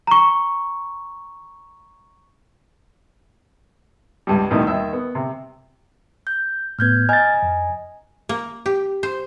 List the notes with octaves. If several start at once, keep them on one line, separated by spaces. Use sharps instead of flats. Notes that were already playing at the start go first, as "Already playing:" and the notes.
A#5 C#6
C#2 G2 G3
D2 G2 B2 D#3 E3
D#2 E5 E6
B3
C3
G6
A2 B3 F6 G6 G#6
D#5 G#5 A#5 F6 A6
F2
A#3
G4
C5